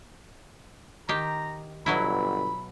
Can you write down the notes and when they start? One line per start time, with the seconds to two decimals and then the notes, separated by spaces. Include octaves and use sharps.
1.09 D#3 G4 A#5
1.86 G1 B2 F#3 E4 B5